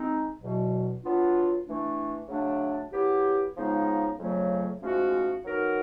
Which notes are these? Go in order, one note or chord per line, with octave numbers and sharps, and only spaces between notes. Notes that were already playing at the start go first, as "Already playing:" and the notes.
Already playing: G#3 C4 D#4
E2 B2 F#3
F#3 B3 D4 F4
E3 A3 D4
C#3 F#3 A3 D4
F#3 B3 E4 G4
C#3 F3 G#3 B3 D#4
F2 C#3 F#3 A3 C#4
G#2 F3 A3 C#4 F#4
F#3 B3 D#4 F#4 A#4